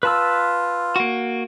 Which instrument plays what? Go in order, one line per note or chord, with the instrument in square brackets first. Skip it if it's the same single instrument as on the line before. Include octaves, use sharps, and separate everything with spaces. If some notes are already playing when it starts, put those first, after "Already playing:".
[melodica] F4 [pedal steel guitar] B4 A5 E6
[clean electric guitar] A#3 F#4